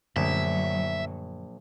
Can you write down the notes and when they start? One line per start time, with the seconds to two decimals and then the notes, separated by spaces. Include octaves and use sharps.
0.16 A#1 F#2 D3 F#3 A3 E5